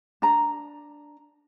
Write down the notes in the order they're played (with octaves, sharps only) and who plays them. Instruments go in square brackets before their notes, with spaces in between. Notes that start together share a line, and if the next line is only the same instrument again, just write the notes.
[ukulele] D4 A#5